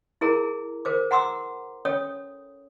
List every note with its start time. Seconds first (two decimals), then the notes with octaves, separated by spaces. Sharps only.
0.21 E4 G#4 A#4 A#5
0.85 A#4 C5 D6
1.11 F#5 A#5 C6 D6 E6
1.85 C#4 A4 C#5 D#6